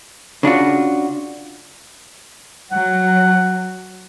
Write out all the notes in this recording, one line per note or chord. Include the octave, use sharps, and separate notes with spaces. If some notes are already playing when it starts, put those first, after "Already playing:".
C#3 D4 F4 F#4
F#3 F#5